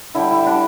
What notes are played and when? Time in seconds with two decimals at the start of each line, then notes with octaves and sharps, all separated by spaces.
0.15 D3 G3 E4
0.31 E4
0.46 D3 G3 D4